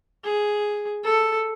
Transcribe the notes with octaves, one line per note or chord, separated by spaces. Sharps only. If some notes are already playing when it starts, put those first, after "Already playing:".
G#4
A4